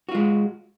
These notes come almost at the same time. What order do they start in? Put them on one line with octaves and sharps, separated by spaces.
F#4 F4 G#3